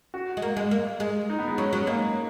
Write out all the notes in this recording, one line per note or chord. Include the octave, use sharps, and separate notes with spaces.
F#4
G#3
A#3
G#3
A#3
G#3
D#4
B3
G#3
F#3 C#4
F#3 C#4
G#3 A#3